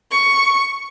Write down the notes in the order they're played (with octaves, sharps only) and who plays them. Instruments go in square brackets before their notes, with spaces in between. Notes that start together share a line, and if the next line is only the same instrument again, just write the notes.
[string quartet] C#6